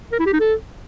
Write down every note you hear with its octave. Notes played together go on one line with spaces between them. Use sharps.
A#4
E4
G4
D#4
A4